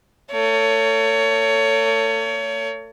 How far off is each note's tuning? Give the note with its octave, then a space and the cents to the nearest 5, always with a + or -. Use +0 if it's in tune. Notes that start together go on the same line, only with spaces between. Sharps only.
A3 +40 C#5 +25